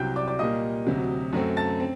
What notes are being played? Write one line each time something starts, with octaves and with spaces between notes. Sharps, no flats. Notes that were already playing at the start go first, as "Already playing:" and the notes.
Already playing: C2 C3 F#3 G5 G6
D5 D6
D5 D6
A#2 G3 A#3 D#5 D#6
D2 C3 F#3
F#2 F#3 A3 C4
A5 A6
C4